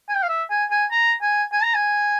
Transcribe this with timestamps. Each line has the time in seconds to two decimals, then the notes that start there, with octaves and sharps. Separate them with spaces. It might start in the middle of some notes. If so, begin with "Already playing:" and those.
0.09 G#5
0.15 G5
0.23 F5
0.29 E5
0.50 G#5
0.71 G#5
0.91 A#5
1.22 G#5
1.52 G#5
1.63 A#5
1.74 G#5